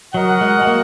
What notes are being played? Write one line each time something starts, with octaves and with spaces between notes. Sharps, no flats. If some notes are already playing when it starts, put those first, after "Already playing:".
F#3 F#4 A#4 D#5 F#5
G#3
G#3
A#3